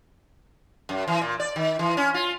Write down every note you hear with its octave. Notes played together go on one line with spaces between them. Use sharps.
F#2
E3
A#2
D5
D#3
E3
C#4
F4